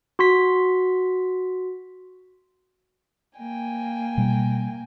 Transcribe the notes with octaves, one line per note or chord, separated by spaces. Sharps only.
F#4 C6 B6
A#3 G5 G#5
B2 G3